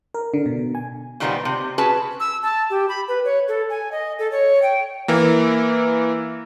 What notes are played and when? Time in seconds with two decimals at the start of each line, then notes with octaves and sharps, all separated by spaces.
0.14 A#4
0.34 D3
0.46 B2
0.75 G#5
1.20 A#2 D#3 G3 G#3 B3 C4
1.45 C3
1.78 C#4 F#4 G#4 B4 A5
2.20 E6
2.43 A5
2.70 G4
2.89 B5
3.08 B4
3.24 C#5
3.48 A4
3.70 G#5
3.92 D#5
4.19 A4
4.31 C#5
4.62 G5
5.08 E3 A#3